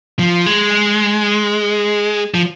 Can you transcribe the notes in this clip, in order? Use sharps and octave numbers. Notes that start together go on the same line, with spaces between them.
F3
G#3
F3